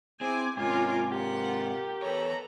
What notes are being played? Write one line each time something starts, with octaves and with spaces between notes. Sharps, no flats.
C4 E4 G#4 G#5 D6
G#2 C3 C#4 F4 A#4 G#5 D6
F4 G4 A#4 F#5
E2 A4 B4 C#5 A#5